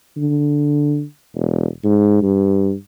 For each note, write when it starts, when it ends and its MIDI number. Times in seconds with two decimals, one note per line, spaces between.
0.17 1.03 50
1.35 1.66 28
1.85 2.19 44
2.23 2.73 43